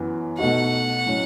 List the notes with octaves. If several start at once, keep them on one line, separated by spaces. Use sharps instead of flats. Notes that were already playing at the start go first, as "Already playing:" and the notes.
Already playing: F#2 E3 B3
B2 A3 D#4 F#4 F#5
A2 F#3 C#4